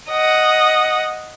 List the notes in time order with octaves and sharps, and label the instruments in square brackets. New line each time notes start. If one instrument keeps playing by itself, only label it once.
[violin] D#5 F#5